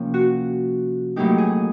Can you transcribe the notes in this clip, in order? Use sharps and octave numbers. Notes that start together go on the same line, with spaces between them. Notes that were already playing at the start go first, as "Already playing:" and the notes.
Already playing: C3 F3 A#3 C#4
F#4
A2 F#3 A#3 D#4 G4
G#4